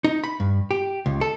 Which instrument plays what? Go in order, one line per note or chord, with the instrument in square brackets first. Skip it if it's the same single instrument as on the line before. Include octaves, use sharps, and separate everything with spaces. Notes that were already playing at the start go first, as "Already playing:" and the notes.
[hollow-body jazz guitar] D#4
B5
G2
G4
C#2
A4